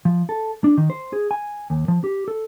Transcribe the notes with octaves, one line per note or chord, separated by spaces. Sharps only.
F3
A4
D4
D#3
C5
G#4
G#5
D#2
F3
G4
A4